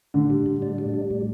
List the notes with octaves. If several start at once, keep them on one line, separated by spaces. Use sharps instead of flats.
A2 D3
G3
A2
D4
G3
G3
A2